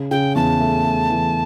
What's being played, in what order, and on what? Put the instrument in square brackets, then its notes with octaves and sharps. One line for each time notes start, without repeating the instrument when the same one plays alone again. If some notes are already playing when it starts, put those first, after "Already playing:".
Already playing: [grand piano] C#3
[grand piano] C#3 [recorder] G5
[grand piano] E2 [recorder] A5
[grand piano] A3
A3
E3